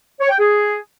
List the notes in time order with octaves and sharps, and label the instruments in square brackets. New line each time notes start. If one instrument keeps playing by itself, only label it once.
[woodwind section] C#5
G5
G#4